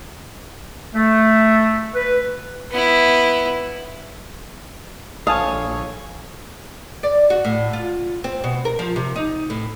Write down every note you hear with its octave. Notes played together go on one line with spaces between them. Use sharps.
A3
B4
B3 E4
A#1 D3 C#5 F5 G#5 A5 D#6
D5
F#4
A2
F4
C4
B2
A#4
F3
C3
D#4
A2